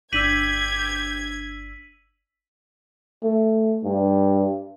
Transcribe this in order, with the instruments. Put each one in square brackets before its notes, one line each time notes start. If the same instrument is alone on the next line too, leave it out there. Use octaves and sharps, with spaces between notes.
[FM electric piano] G1 D4 E6 [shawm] G4 [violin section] G#6 [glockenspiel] B6 D#7 F#7
[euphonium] A3
G2